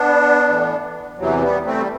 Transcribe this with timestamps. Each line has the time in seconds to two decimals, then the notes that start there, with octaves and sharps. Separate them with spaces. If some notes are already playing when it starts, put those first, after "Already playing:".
Already playing: B3 D4
0.49 A2 E3
1.18 E2 C3 E3 F#3
1.42 G3 B3
1.65 A3 C4
1.78 G3